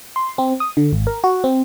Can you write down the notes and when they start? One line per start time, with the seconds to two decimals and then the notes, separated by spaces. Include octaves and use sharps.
0.16 C6
0.38 C4
0.60 D#6
0.77 D3
0.93 G#1
1.07 A#4
1.24 F#4
1.44 C4